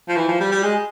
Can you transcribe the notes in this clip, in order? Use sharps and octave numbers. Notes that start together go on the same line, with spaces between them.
F3
E3
F3
G3
G3
G#3